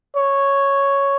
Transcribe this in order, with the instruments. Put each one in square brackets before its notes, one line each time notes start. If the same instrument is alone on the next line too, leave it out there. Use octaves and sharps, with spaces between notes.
[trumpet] C#5